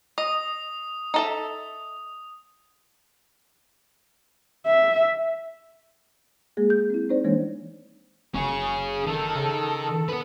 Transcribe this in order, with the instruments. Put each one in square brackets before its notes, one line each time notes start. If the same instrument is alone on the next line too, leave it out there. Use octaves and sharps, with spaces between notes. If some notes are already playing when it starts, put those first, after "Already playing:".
[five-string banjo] D#5 [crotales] D#6
[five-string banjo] D#4 A4 E5
[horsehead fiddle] E5
[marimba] G#3 A#3 G#4
G6
C4 E4
C4 D#4 C5 D5
E3 G#3 A#3 D4 C#5
[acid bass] F#1 [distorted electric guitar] C#4 G#4 [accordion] C#6
[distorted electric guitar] D#3 [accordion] A4
[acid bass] C#3
[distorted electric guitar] B3 B4